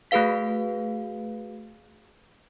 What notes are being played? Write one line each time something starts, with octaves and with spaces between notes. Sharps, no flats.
A3 F#4 G#4 B4 F5 B6